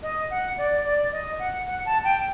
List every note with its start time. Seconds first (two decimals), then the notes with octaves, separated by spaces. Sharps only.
0.03 D#5
0.30 F#5
0.58 D5
0.86 D5
1.12 D#5
1.39 F#5
1.67 F#5
1.86 A5
2.04 G5